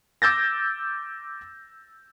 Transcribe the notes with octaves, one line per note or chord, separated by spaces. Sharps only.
D6 E6 G6 A6 A#6